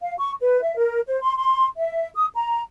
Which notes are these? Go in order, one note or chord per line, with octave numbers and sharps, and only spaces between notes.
F5
C#6
B4
E5
A#4
C5
C6
C6
E5
D#6
A#5